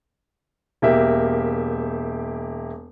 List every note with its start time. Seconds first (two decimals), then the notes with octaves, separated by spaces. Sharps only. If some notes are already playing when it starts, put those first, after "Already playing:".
0.82 E1 A#3 G4 E5